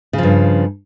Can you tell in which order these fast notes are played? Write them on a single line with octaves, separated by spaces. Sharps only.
C#3 F3 G2